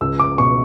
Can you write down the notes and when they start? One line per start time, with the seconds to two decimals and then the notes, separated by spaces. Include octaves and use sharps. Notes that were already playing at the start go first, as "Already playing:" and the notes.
0.01 C#2 E6
0.20 D6
0.38 B2 C#6